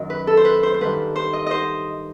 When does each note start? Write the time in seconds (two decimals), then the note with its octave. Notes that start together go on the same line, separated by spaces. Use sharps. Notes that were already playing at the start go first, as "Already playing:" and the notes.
Already playing: F#2 D#3 D#5
0.10 B4
0.27 A4
0.37 C5
0.45 B4
0.63 C5
0.74 C5
0.81 G2 D#3 B4
1.16 C5
1.33 D#5
1.46 C5 D#5